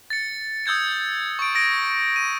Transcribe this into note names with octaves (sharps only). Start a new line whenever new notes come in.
A6 C#7
D#6 E6 G6 G#6 C#7
C#6 D7
D#6 A#6 D7
D#7